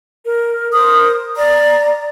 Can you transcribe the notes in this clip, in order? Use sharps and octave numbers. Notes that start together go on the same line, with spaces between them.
A#4
A#4 C5 D#6
D5 A#5